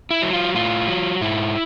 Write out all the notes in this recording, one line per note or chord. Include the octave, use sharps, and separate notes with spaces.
E4
F#3
F4
A2 F4
F#3
G#2 E4